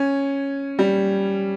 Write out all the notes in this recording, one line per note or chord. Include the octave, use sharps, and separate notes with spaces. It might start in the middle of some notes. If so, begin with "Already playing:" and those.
Already playing: C#4
G3